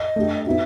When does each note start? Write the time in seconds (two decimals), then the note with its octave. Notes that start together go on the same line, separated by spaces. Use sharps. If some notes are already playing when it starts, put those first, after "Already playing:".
Already playing: D#5
0.16 A3 D4 G4
0.47 B3 D#4 F#4 E5